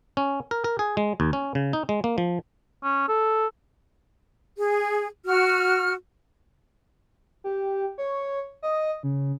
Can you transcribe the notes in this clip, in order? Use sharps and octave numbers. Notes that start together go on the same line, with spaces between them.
C#4
A#4
A#4
G#4
G#3
D#2
C#4
C#3
D#4
G#3
A#3
F3
C#4
A4
G#4
F#4 F6
G4
C#5
D#5
C#3